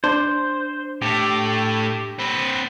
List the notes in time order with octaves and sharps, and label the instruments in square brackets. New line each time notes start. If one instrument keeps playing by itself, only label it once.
[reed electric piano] D4 [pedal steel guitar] C5
[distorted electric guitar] A2 A3 [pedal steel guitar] G4
[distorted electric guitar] C4 B4